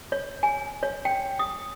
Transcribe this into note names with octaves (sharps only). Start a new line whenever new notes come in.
C#5
G#5
C#5
G5
D#6